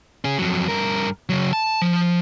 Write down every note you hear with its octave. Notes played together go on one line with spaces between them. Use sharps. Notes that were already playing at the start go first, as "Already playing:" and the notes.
C#4 G#4
F2 F#3
G2 A#4
C#3 F#3
A5
F3